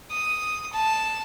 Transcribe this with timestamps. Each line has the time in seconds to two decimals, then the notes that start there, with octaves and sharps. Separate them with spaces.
0.10 D#6
0.73 A5